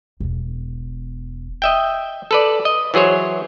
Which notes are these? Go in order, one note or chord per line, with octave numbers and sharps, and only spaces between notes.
E1 B3
D#5 E5 G5
A4 B4 D5
D#5
E3 F#3 G#4 C5 C#5